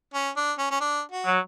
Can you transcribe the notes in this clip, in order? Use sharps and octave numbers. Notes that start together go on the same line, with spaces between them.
C#4
D4
C#4
C#4
D4
F#4
F#3